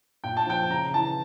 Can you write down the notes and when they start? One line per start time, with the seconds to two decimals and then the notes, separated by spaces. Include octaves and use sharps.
0.24 A#2 G5
0.37 A5
0.47 F3 G5
0.70 C#3 A#5
0.94 E3 A5